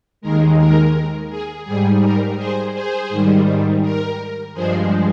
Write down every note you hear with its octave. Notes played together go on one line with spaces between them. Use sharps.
D#2 D#3 G#3 A#4
A#4
G#4
G#2 G3 G#4
A#4
G#4 C5
G#4 C5
G#2 D#3 G3
A#4
G2 F3 G#3 G#4 C5